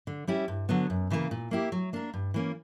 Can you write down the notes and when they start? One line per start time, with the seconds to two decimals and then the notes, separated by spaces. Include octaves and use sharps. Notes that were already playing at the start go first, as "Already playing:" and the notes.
0.07 D3
0.27 G3 C#4 E4 G4
0.48 G2
0.69 D3 F#3 B3
0.90 F#2
1.10 C#3 E3 G3 A#3
1.31 A#2
1.51 A#3 E4 G4
1.72 F#3
1.93 A#3 D4 A#4
2.14 G2
2.34 E3 A#3 C#4